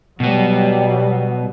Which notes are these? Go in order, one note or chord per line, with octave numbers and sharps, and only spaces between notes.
B2 F#3 G3 B3